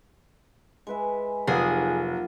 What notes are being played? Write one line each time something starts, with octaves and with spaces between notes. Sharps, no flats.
G#3 B4 E5 G#5
F1 F#3 A#3 F4 F#4 G#4 F#5